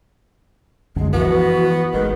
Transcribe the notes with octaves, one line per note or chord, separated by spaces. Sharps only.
C2 F#2 D3 G#3
E3 F3 B3 F#4
G#1 D#3 G#3 B4